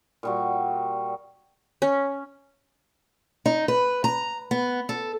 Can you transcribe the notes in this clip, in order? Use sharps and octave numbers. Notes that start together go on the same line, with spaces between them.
A#2 G3 F#4
C#4
D#4
B4
A#5
B3
A4